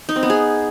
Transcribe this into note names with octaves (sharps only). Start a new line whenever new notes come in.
D#4
C4
B3
G#4